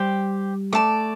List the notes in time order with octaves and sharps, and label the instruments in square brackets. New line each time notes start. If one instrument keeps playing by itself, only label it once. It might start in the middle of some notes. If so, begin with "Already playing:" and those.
Already playing: [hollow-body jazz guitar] G3 [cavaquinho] G4 C5 G5 D6
[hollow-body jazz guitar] A3 [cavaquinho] D5 A5 D6